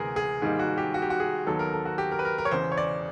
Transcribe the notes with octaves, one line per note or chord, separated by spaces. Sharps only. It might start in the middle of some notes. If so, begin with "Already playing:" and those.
Already playing: D2 C3 E3 G#3 B3 G#4 A#4
G#4
G#2 D#3 G3 A#3 D#4 G#4
F#4
G4
F#4
G4
F#4
G#4
D#2 D#3 F#3 B3 A4
A#4
A4
F#4
G4
A#4
B4
A#4
A#4
C#5
E1 E2 C#3 C5
C#5
D5